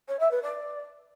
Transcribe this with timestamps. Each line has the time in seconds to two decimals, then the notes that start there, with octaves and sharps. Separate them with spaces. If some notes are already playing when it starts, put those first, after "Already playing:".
0.08 C#5
0.20 E5
0.31 B4
0.43 D5